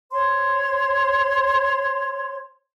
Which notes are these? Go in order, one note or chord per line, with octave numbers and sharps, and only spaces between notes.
C5 C#5 C6